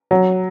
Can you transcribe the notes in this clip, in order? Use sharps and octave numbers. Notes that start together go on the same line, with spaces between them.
F#3